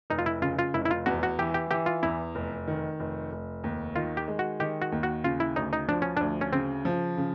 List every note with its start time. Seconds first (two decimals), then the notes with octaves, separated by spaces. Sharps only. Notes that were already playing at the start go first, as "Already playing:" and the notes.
0.10 F1 D#4
0.19 F4
0.26 E4
0.42 C#3 F4
0.59 F4
0.74 F1 E4
0.85 E4
0.91 F4
1.06 E2 F#4
1.23 F#4
1.39 E3 G4
1.54 G4
1.71 E3 G4
1.86 F4
2.03 E2 E4
2.35 F1
2.68 D#3
3.00 F1
3.32 F1
3.64 D#2
3.96 D#3 F4
4.17 G4
4.28 G#3
4.39 F#4
4.60 D#3 G4
4.82 F#4
4.92 D#2
5.03 F#4
5.24 C#3 F4
5.40 E4
5.56 D2 D#4
5.73 D#4
5.88 F3 D4
6.02 C#4
6.17 D2 D4
6.41 C#4
6.53 C#3 C4
6.85 F3
7.17 C#3